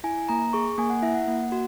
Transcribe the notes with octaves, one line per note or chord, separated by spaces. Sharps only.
E4 G#5
A#3 A#5
G#4 C#6
A#3 G#5
F#5
E4 E5
F#5
A#3
F#4